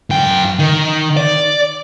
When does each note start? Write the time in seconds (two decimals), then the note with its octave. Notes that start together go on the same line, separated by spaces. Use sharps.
0.10 F#2 G5
0.59 D#3
1.17 D5